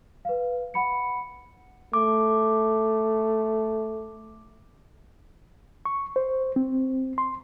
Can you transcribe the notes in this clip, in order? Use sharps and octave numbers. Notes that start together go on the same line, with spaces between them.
B4 F5
F#5 B5 C#7
A3 D6
C#6
C5
C4
C6